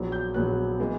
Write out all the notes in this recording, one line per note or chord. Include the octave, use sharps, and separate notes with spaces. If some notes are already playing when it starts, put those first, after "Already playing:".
Already playing: A#1 A#2 F#3 B3
G6
A#1 A#2 F#3 B3 F#6
E3 G#3 B3